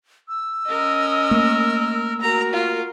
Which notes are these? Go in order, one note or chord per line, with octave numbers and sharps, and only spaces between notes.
E6
C#4 A#4 D#5
A3 A#3
F#4 A#4 A#5
F4